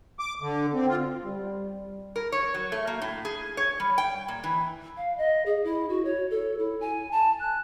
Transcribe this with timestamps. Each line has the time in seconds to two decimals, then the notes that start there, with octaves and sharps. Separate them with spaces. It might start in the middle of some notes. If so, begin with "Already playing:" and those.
0.19 D6
0.42 D3
0.74 C4
0.88 F4
1.24 G3
2.16 A#4
2.32 C#5
2.54 F#3
2.72 A3
2.87 A#3
3.02 A2
3.25 G#4
3.57 C#5
3.80 G3
3.98 G5
4.28 A#2
4.44 E3
4.97 F5
5.18 D#5
5.46 G#4
5.64 E4
5.89 F#4
6.05 C#5
6.31 A4
6.59 E4
6.81 G#5
7.12 A5
7.40 F#6